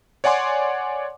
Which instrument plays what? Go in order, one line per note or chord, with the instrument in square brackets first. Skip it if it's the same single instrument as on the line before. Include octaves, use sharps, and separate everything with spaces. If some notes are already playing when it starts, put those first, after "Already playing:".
[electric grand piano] C#5 D5 F#5 G#5 C6 D6